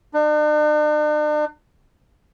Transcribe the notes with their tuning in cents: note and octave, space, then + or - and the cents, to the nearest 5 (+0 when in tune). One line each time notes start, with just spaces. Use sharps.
D4 +45